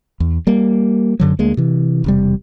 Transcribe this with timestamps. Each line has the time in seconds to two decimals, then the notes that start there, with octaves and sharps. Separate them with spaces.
0.20 E2
0.47 G3 A#3
1.20 F#2 D3 F#3
1.39 D2 G#3 A#3
1.57 C3 E3
2.04 E1 C3 G3